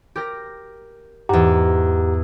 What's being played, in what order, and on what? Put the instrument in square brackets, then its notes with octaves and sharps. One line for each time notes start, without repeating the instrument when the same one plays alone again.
[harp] G4 A#4 A#6
[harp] E2 G#2 [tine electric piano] G4 F#5 A#5